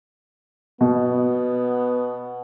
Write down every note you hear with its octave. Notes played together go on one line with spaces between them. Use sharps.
B2 B3